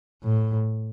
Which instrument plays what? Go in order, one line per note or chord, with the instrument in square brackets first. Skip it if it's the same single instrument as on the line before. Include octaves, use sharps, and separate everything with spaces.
[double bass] A2